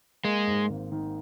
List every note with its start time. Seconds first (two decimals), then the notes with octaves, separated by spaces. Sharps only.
0.24 G#3 A#3
0.47 G#2
0.70 G#1
0.92 D#3